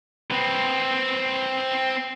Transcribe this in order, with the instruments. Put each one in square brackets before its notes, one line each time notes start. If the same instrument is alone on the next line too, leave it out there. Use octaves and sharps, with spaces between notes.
[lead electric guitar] C4 B4